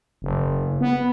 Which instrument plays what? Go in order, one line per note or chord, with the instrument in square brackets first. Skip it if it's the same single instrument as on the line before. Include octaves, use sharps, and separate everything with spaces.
[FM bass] F#1
B3